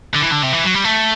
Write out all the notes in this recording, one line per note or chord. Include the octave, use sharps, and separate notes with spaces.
D3
E3
D3
C3
E3
F#3
G3
A3